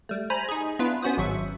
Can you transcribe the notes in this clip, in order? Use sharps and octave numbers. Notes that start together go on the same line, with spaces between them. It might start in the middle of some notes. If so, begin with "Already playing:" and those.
G3 A3
C5 G#5 A#5 B5
D#4 G#4
B3 D4 E4 F4 B4
B3 C#4 F#4 C5 D#6
G#1 F#3 E5 C#6